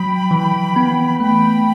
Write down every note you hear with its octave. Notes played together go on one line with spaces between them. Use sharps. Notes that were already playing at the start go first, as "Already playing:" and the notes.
Already playing: F#3 G5 B5
E3
B3
A3 G5 B5